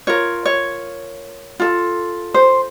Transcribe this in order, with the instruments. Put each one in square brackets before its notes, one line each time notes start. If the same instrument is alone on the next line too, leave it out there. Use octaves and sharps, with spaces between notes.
[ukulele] F4 A#4 C#5
C#5
F4 A4
C5